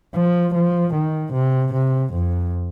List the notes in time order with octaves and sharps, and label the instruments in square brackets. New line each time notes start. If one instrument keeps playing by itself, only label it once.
[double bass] F3
F3
D#3
C3
C3
F2